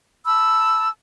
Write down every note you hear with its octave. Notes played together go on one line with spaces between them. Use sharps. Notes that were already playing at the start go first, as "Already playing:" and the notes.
A5 B5 E6